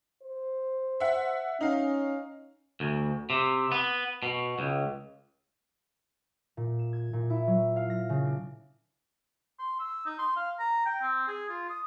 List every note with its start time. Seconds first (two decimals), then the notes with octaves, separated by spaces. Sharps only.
0.23 C5
1.00 E5 F#5
1.61 C#4 D#4 F5
2.80 D2
3.30 C3
3.72 B3
4.23 B2
4.59 C#2
6.57 A#2
6.79 E7
6.93 G#6
7.13 A#2
7.30 E4
7.47 F#3
7.76 F5
7.90 A#6
8.10 C#3
8.25 D4
9.59 C6
9.80 E6
10.06 D#4
10.19 C6
10.37 F5
10.59 A#5
10.86 G5
11.02 C4
11.28 G#4
11.49 F4
11.70 D#6